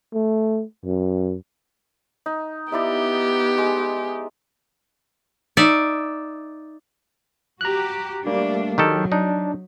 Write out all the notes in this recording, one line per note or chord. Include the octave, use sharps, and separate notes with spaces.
A3
F#2
D#4
B3 D#4 E4 G4 D5
G#3
D#4 D5 E5
F#4 G4 A#5 F#6
G3 A3 A#3 D4
D#3 F#3 G4 A4
D4 D#4